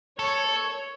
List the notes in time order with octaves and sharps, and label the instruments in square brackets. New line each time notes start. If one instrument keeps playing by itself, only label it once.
[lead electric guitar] A4 [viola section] C#5
[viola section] C#5